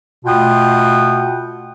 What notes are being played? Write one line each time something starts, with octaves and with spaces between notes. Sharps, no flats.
B2 A3 F4 F#5 G5 D#6